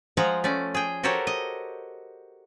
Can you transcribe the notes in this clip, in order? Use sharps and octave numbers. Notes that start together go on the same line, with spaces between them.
F3 G#3 F5 F#5 A#5
A3 C#4 D5
G#4 G5
F#4 G4 A4 A#4 C5 C#5
D#5